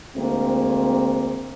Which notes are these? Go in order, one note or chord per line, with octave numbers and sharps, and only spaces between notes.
D2 G#3 A#3 C4